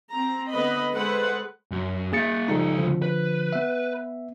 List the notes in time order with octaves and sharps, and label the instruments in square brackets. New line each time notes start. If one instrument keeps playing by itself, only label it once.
[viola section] C4 A#5
D3 B3 B4 D#5 B5
G#3 G#4 A4 B4 C5 F#5
[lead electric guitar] F#2
[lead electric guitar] A#3 E5 [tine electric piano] G#4 A6 C#7
[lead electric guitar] C#2 A4 [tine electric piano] F3 G3 D#4
[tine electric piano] D3 F3
[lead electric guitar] B4
[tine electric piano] B3 E5